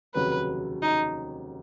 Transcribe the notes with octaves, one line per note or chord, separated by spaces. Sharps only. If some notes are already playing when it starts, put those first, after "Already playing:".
F1 D#2 C#3 F#3 B4
D#4